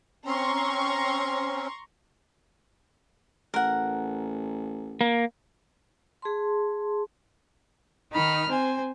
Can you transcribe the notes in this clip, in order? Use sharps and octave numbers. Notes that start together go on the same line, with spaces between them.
C4 C#4 A#5 C6 C#6
A1 A#4 F#5
A#3
G#4 A5 C6
D#3 D#4 B5 F6
C4 C5 G#5